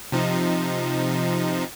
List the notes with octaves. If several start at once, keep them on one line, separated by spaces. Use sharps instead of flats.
C3 F3 D#4